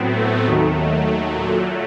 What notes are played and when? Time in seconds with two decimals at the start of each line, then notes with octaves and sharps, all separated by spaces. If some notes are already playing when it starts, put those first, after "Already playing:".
Already playing: A2 F#3 B3 C4
0.15 A3
0.45 D#2 D#3 F#3 A3
1.36 A#2 F#3